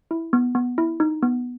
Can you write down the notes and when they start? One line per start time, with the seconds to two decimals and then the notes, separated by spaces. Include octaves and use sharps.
0.11 E4
0.33 B3
0.55 B3
0.78 E4
1.00 D#4
1.23 B3